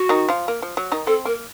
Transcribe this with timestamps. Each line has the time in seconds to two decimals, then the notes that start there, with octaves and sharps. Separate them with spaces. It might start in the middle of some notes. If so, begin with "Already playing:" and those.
Already playing: F#4
0.09 D#3 D#4
0.29 F3 F4
0.48 A#3
0.62 F3
0.77 F#3
0.92 D#3 D#4
1.07 C4 A4
1.25 A#3 A#4